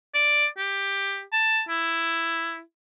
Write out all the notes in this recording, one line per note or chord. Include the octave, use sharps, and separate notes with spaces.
D5
G4
A5
E4